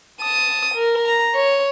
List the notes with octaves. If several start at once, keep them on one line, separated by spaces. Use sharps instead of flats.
A5 D#6
A#4
A#5
C#5